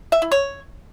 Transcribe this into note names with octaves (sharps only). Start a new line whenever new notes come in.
E5
E4
C#5